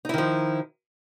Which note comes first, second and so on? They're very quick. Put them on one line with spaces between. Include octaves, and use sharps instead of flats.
D#4 E4 D#3 F3